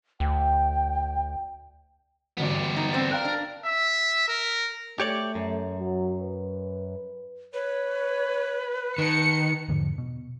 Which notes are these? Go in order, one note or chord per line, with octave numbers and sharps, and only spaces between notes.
D2 G5
A1 D2 G2 B3 G4
D#4
C4 C5 D5
A#4 F5 G5 A#5 F#6
D4
E5
A#4
A3 G4 C#5 D5
F#2
F#3
B4
B4 C#5
D#3 A5 C#7
E2 G#2 D3 F3
B2